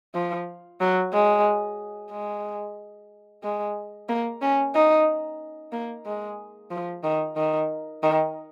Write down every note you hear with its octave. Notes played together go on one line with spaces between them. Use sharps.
F3
F#3
G#3
G#3
G#3
A#3
C#4
D#4
A#3
G#3
F3
D#3
D#3
D#3